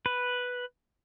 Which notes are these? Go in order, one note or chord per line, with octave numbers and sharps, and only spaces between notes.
B4